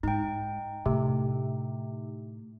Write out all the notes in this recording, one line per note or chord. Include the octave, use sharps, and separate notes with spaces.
G#2 D#4 G5
A2 C3